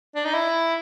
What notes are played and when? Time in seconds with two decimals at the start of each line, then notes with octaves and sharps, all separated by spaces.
0.15 D4
0.25 D#4
0.34 E4